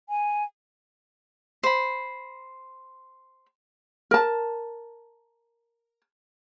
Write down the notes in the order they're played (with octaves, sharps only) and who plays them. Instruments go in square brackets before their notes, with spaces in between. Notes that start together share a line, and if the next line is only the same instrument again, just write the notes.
[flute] G#5
[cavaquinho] C5 B5
[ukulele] A#4 A5